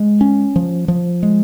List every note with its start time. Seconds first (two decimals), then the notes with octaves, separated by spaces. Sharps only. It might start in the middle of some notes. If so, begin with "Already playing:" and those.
Already playing: G#3
0.21 C#4
0.56 F3
0.88 F3
1.23 G#3